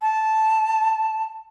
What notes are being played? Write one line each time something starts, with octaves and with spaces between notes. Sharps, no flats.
A5